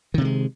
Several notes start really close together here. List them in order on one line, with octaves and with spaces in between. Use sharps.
D#3 C3 A3 G#3